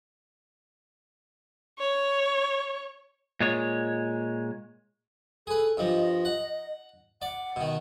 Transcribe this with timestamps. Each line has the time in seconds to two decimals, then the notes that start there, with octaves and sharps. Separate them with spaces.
1.78 C#5
3.40 A#2 G#3 C#5
5.47 G#4 A4 B4
5.77 G2 F3 D#5
6.25 F#5
7.22 D5 F#5
7.56 B2 D#3